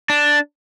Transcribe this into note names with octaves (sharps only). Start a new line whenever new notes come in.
D4